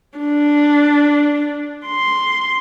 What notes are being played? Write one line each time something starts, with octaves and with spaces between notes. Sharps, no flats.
D4
C6